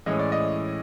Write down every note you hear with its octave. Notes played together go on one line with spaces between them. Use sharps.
A2 E3 G#3 C#4 D#5
D5
D#5